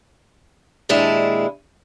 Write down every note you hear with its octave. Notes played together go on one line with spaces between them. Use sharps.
D#2 A#2 G#3 D4 E4 F5